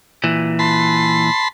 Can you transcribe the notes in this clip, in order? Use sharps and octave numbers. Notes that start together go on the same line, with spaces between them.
A#2 E3
A5 B5 C6